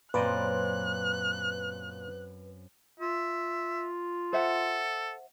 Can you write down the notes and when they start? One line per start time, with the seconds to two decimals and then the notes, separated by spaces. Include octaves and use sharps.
0.14 F#2 A#2 C4 B4 D5 D#5 F#6
3.00 F4 E5
4.33 A4 C5 E5 F#5